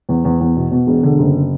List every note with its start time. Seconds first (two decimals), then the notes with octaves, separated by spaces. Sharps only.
0.09 E2
0.25 E2
0.40 E2
0.57 B2
0.71 B2
0.87 E1
1.03 D3
1.19 F#1